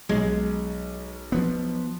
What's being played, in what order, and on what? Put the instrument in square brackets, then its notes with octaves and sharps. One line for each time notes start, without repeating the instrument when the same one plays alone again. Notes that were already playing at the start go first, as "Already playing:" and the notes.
[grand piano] B1 [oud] G#3
[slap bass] F3 B3